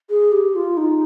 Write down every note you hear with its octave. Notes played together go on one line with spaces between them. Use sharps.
G#4
G4
F4
D#4